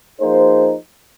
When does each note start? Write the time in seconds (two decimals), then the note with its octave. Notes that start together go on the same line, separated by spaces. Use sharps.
0.19 F3 A#3 D#4 G#4 C5